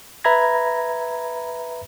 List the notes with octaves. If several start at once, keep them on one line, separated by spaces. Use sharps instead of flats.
B4 E5 A#5 B5 G#6 A#6